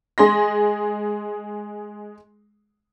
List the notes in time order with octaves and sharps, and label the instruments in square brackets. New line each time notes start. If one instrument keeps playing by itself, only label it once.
[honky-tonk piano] G#3 G#4 C6 A#6